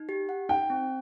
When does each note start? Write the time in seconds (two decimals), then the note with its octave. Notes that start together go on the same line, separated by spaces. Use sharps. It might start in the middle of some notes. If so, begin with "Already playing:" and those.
Already playing: D#4
0.09 G4
0.29 F#5
0.49 D#4 G5
0.70 C4